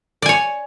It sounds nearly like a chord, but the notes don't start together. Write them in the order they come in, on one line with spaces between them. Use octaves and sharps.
D5 G#5 C#5